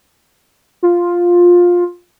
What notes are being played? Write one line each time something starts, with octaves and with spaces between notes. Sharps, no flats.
F4